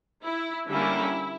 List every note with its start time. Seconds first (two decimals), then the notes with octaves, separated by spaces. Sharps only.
0.24 E4
0.68 D3 G3 A#3 C#4 E4